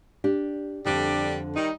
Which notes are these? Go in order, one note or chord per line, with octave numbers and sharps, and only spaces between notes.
D4 G4
F2 D3 G3 D4
D#3 G3 D#4